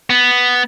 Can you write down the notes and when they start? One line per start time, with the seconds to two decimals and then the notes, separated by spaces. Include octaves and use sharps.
0.10 B3